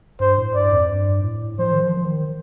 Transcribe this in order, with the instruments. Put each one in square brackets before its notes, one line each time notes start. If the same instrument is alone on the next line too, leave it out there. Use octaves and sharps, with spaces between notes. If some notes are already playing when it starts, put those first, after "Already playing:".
[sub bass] G2 [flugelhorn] C5
[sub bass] A2
[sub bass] G2 [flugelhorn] D5
[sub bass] F2
G2
A2
[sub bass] F3 [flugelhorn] C5
[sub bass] D#3
F3
F3
D#3